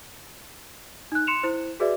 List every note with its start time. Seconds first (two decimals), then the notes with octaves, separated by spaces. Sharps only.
1.12 D#4 F#6
1.27 C6 C#7 E7 F7
1.43 E4 C5
1.80 F#4 G#4 B4 D5 E5